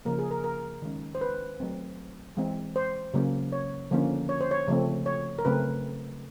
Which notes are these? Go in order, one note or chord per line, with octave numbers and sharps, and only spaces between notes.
C#3 F3 A#3 A#4
G#4
A#4
A#4
D#3 G#3 C#4
C5
B4
F#3 A3 C4
E3 G#3 C4
C5
C#3 F#3 A#3 C#4
C#5
D3 F3 A#3 C#4
C#5
C5
C#5
C#3 F3 A3 C4
C#5
A#4
C#3 F#3 A3 C4 B4